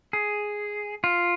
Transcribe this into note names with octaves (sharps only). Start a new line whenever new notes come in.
G#4
F4